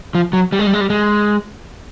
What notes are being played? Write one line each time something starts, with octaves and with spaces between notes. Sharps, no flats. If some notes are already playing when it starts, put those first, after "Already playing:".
F3
F#3
G3
G#3
G3
G#3
G3
G#3